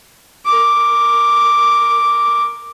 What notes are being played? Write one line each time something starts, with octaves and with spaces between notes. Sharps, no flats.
A#4 D6